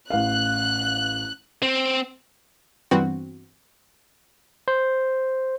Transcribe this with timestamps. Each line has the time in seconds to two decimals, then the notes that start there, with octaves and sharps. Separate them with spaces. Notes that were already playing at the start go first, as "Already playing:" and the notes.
0.10 A1 F5 F#6
1.62 C4
2.91 G2 E3 B3 C4 F#4
4.68 C5